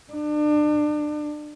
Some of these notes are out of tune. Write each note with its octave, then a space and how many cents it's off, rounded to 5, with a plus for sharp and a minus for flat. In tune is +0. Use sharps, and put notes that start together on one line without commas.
D4 +30